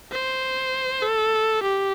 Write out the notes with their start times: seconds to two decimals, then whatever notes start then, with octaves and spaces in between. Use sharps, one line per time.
0.12 C5
1.02 A4
1.63 G4